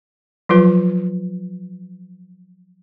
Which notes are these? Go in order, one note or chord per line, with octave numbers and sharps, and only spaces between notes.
F3 F#3 F4 B4